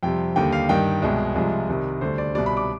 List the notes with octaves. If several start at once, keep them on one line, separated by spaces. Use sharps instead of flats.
F2 C3 G3 G5
D#2 D3 G3 G5
F5
G2 D#3 G3 G5
C2 B2 G#3
C2 C3 F3 G#3
C2 C3 D#3 G3
D2 D3 G3 C5
D5
C2 B2 G3 D5
B5
D6